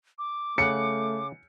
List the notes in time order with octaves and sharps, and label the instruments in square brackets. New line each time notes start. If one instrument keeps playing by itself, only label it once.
[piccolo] D6
[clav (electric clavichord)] C#3 F#5 [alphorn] A3 [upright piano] C#7